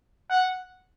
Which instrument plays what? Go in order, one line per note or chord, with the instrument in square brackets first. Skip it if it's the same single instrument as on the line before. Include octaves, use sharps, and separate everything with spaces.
[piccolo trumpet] F#5